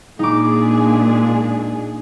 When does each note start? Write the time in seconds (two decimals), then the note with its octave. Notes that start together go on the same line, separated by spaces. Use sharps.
0.19 A#2 G#3 D4 D#4 G#4 D6